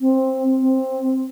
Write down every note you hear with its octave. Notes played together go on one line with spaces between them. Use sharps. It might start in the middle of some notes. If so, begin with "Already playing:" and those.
C4
C4